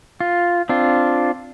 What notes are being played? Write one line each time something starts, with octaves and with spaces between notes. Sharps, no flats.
F4
C4 D4 F4